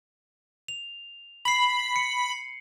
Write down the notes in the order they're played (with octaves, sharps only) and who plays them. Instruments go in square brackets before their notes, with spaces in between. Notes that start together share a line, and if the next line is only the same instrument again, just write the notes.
[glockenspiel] F7
[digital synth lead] B5 [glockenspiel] C7 F#7
[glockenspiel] C#7